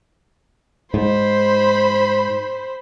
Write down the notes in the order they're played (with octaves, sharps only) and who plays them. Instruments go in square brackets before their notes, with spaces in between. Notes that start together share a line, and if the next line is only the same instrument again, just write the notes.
[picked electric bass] G#2 [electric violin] C5 B5